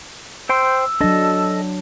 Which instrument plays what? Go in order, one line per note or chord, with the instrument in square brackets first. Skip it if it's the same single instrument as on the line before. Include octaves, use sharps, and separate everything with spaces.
[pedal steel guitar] C5 G5 C6 [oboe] E6
[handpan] F#3 D4 [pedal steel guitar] A4 D#5